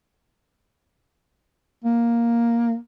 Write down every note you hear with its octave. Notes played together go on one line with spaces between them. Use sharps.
A#3